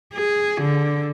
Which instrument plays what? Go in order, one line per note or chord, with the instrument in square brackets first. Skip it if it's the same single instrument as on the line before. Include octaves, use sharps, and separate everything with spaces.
[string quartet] G#4
D3